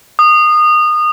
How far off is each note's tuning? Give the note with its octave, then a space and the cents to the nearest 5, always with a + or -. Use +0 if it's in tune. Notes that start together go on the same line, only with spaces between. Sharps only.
D#6 -25